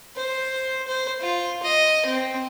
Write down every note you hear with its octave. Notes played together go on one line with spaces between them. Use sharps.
C5
C5
F4
D#5
C4